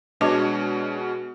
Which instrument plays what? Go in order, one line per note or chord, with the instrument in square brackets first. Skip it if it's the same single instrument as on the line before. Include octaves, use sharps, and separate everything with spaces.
[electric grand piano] B2 G#3 F#4 [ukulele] D4 C#5 D#5